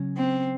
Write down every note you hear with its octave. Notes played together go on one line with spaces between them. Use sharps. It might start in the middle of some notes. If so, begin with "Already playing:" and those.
Already playing: C#3 F#3 C#4
C4